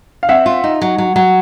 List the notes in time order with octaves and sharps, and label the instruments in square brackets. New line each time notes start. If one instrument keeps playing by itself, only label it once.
[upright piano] F5
[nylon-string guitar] C4 [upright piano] E5 F#5
[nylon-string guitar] F4
D#4
F#3
F#3
F#3